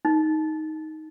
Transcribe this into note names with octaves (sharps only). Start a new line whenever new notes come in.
D#4